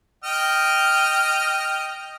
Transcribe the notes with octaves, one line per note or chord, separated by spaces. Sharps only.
D#5 G5 F6